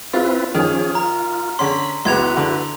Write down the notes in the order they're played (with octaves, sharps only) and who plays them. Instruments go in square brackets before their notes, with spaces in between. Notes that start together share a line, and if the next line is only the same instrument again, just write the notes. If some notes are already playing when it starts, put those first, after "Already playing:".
[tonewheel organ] C4 E4 B4 [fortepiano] F4
[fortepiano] D#3 [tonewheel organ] F3 C#4 G#4
[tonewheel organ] F4 [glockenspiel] A#5
[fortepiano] D3 C#4 [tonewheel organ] B5 [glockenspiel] C6
[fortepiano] C#2 B3 [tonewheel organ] E4 F#4 B4 [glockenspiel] C6 G#6 F7
[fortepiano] D3